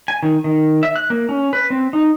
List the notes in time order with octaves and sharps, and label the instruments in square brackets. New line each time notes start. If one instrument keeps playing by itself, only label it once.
[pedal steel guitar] G#5
D#3
D#3
E5
F#6
A#3
C#4
B4
C4
D#4